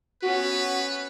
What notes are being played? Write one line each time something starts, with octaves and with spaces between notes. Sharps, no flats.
B3 C#4 F#4 B4